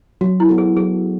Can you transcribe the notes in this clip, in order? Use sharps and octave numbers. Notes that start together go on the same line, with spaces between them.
F#3 F#4
E4
B3 F#4 A4
G#4
F#3 G#4